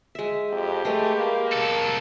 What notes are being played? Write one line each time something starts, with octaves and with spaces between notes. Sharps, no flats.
G#3 E5
F2 G4
G#3 A3 B4
A#3
C2 A4